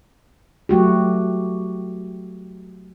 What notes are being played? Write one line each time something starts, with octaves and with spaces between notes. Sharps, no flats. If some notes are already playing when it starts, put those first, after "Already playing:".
F#3 A3 F#4 G4